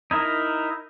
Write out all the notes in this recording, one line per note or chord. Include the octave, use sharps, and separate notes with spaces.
D#4 E4 A#4